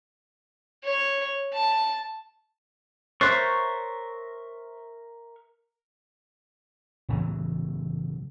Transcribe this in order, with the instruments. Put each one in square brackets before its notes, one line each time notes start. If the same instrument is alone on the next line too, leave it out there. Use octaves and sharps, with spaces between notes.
[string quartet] C#5
A5
[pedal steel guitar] A#4 E5 C#6 [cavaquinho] C5 [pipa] C#5 [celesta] F#6 A6 C7
[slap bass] A2 C#3 E3 F#3